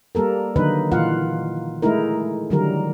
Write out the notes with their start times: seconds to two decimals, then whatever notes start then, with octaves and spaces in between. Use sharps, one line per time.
0.15 G3 A#3 A4 A#4
0.56 D3 D#3 F#3 A#3 D#4 B4
0.92 A#2 E3 F4 F5 F#5
1.82 G#3 A3 D#4 E4 A#4
2.50 D3 D#3 F#3 G3 A#4